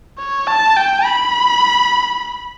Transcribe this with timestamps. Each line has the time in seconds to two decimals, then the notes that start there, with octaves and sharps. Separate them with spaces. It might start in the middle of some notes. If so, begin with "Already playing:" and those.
0.19 C#5
0.48 A5
0.77 G5
1.05 B5